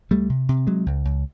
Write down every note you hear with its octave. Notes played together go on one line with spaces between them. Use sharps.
C#2 G3 A3
C3
C3
C3 F#3 G#3
C#2
C#2